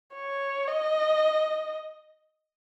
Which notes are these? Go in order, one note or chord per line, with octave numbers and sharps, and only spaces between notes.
C#5
D#5